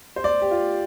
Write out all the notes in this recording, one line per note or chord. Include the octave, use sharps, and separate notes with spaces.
C5
D5
G4
F4